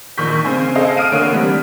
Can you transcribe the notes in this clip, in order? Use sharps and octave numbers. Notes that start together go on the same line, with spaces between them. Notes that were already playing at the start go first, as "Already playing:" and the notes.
A#1 D#3 C#6 G6 B6
C#3 C4 G#5
G#4 A4 C5 D#5 F5 A5
F5 D#6 F6 D7 D#7
D3 A#3 C#5
C3 E3 G3